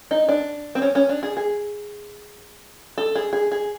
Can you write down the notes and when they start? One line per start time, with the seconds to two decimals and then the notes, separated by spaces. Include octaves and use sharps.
0.11 D#4
0.29 D4
0.75 C4
0.82 C#4
0.95 C#4
1.09 D4
1.23 G#4
1.37 G#4
2.98 A4
3.15 G#4
3.33 G#4
3.52 G#4